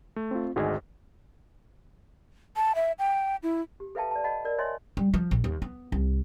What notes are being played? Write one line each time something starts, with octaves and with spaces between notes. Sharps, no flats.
A3
C4 F4
G#1 D2 G#2 F#4 G#4 D#5
A5
E5
G5
E4
G4
A4 B4 E5 F5 G5 A5
D5 A5
D#5 F#5 A5 B5
A#4 D5
C#5 D#5 E5 G#5 C6
G3
F3
A#1
D#2
B3
C2